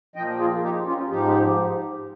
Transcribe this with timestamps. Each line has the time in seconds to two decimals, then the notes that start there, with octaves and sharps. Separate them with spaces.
0.16 A#2 F3 D#5 G5
0.39 F4 G#4
0.63 D#4 G4
0.86 C#4 F4
1.10 G#2 F3 D#4 G4